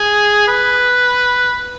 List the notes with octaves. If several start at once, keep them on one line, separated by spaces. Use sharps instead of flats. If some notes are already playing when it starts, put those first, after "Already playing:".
Already playing: G#4
B4